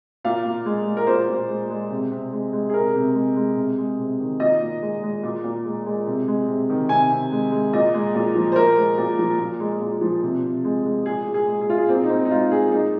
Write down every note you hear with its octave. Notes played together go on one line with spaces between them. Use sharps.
A#2 F5
A#2
G#3
G#3
A#4
A#2 C5
A#2
G#3
G#3
C3
C3
G#3
G#3
G#4
C3 A#4
C3
G#3
G#3
C3
G#3
C3
D#3
A#2 D#5
A#2
G#3
G#3
A#2
A#2
G#3
G#3
C3
G#3
C3
D#3
C3 G#5
C3
G#3
G#3
A#2 D#5
G#3
A#2
F3
C5
A#2 A#4
G#3
A#2
F3
A#2
G#3
A#2
F3
C3
C3
G#3
G#3
A#2 G#4
A#2
G#4
G#3
G#4
G#3 F4
G#4
A#2 C4
D#4
A#2 C4
D#4
G#3 F4
G#3 G#4
A#2 D#4